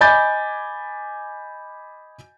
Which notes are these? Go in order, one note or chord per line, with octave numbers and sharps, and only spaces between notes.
D#5 G#5 B5 D6 G6 A6